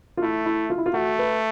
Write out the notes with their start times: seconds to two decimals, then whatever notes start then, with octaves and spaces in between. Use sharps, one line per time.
0.17 F4
0.22 A3 E4
0.46 E4
0.70 F4
0.78 E4
0.86 F4
0.94 A3 F#4
1.19 B4